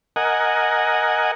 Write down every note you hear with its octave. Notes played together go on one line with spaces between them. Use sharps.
A#4 D#5 F#5 G#5